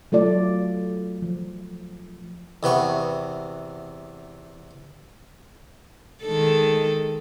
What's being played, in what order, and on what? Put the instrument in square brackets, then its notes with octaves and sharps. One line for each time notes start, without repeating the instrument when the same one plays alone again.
[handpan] F#3 A3 F4 D5
F3
[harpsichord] E2 C3 B3 C#6
[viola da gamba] D#3 G#3 A4